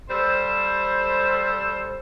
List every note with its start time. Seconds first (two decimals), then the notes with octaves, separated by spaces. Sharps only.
0.10 G3 A4 C5